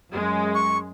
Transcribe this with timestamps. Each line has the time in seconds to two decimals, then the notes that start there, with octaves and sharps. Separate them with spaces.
0.14 F#2 G#3
0.54 C#6